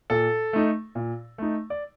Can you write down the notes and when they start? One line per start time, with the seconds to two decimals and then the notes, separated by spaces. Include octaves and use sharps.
0.10 A#2 A4
0.53 A3 D#4
0.95 A#2
1.38 A3 D#4
1.70 D5